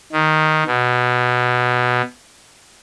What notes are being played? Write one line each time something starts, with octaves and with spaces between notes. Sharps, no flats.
D#3
B2